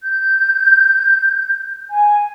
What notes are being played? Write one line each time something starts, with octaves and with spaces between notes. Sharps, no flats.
G6
G#5